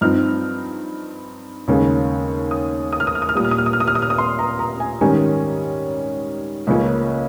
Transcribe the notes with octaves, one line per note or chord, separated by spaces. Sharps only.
G2 F3 C4 D#4 F6
D#2 C#3 G#3 C#4
D#6
D#6
F6
D#6
F6
D#6
F6
A#2 G3 A#3 D#6
F6
D#6
F6
D#6
F6
D#6
F6
D#6
F6
D#6
C6
A#5
A#5
G#5
G#2 D#3 G3 C#4 G#5
C#2 C#3 F3 A#3 C#4